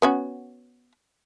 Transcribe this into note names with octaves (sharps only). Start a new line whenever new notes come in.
B3 C#4 F#4